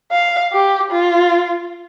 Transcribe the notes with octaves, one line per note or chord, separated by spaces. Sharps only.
F5
G4
F4